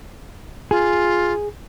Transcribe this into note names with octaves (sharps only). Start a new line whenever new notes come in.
F4 G#4